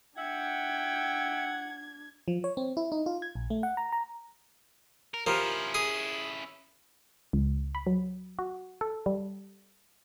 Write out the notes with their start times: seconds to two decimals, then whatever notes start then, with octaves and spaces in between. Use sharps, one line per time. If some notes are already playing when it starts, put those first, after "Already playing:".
0.17 D4 E5 F#5 G5 G#6
2.28 F3
2.44 C#5
2.57 C4
2.77 E4
2.92 D#4
3.06 F4
3.22 G#6
3.35 A#1
3.50 A3
3.63 F#5
3.77 A#5
3.92 A#5
5.14 A#4
5.27 F3 C#4 E4 G4 A#4
5.75 G#4
7.33 C#2
7.75 B5
7.87 F#3
8.39 F#4
8.81 A4
9.06 G3